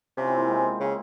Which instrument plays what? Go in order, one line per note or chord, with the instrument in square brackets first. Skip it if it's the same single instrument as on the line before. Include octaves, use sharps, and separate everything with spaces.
[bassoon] C3 [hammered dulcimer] C#4 F4
[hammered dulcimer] C4 E4
A#3 C#4
G#3 C4
[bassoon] C#3